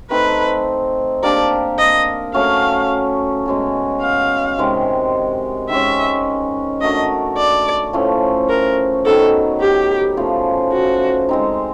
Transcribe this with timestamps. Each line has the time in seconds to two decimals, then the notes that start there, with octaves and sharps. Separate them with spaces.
0.10 A3 C4 D#4 B4
1.23 A#3 D4 G4 A#4 D5
1.79 D#5
2.34 F#3 A3 C#4 F5
3.46 B2 G#3 C#4 F#4
4.02 F5
4.58 C3 D#3 G#3
5.70 D#3 G#3 C#4 E5
6.81 A3 D4 F#4 A#4 D#5
7.38 D5
7.93 A2 F3 A3 C#4
8.49 A#4
9.06 D#3 F#3 B3 D#4 A4
9.61 G4
10.17 C#3 F3 A3
10.72 F#4
11.29 G#3 C4 D#4